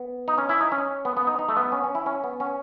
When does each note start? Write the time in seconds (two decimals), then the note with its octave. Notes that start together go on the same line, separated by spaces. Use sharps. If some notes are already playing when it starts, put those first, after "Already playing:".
Already playing: B3
0.28 D#4
0.38 C#4
0.49 E4
0.61 D#4
0.72 C#4
1.05 B3
1.17 B3
1.27 D#4
1.39 D#4
1.49 A3
1.56 B3
1.72 C#4
1.84 C#4
1.95 E4
2.06 C#4
2.24 B3
2.40 C#4